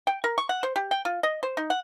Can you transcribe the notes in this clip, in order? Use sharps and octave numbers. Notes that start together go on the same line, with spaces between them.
G5
A#4
C#6
F#5
C5
G4
G5
F4
D#5
C5
D#4
F#5